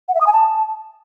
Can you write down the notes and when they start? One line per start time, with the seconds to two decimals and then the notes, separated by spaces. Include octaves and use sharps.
0.08 F#5
0.14 E5
0.21 D#6
0.27 G#5
0.33 A5